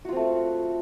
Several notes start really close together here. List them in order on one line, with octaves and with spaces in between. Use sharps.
F#4 F4 C4 A3